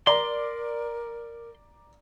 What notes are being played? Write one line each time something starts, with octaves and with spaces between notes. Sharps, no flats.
A#4 D5 A#5 C6